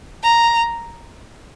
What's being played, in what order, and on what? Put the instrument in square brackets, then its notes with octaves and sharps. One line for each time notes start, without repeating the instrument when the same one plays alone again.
[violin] A#5